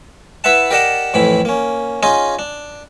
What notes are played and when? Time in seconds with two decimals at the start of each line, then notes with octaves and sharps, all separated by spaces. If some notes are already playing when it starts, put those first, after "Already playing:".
0.44 E4 B4 E5 F#5 A5
0.71 G4 A#4 D5 D#5 F#5 A5
1.14 F2 A2 E3 B5
1.45 A#3 C#4
2.03 C#4 D#4 F4 G#4 D#5
2.39 D4